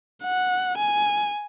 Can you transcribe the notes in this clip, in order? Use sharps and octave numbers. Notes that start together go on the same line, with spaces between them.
F#5
G#5